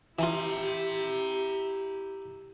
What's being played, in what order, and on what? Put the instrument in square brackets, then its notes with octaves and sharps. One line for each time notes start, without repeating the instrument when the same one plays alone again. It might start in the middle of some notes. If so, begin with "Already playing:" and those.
[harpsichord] E3 F4 [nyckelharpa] E4 G4 [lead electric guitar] E5 A#5